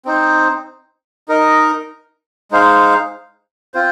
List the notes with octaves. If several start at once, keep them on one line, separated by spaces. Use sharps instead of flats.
C4 D#4 C5
D#4 A#4 D#5
G#3 D#4 C5 F5
C4 F4 C5